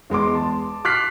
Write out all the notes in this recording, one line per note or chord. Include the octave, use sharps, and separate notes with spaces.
E2 G#3 C6 D6
A5
D6 F6 F#6 B6 C7